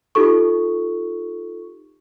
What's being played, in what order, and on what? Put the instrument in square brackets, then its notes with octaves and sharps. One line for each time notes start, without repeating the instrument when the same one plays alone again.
[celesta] D#4 F4 G4 A4 C#6